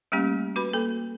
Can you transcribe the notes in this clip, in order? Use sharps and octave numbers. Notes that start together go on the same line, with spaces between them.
G3 A3 A#3 C#4 G4
F#4 B4 B5
A#3 A4